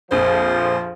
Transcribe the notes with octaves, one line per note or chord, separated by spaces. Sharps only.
A#1 F2 F3 C5